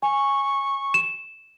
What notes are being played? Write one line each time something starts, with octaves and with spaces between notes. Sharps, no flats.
G#5 C#6
E7